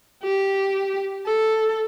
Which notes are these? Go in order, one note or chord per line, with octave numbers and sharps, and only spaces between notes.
G4
A4